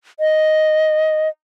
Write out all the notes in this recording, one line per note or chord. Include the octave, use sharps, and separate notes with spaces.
D#5